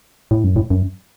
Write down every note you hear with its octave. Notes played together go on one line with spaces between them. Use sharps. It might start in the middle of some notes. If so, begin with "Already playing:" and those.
A2
F#2
A2
F#2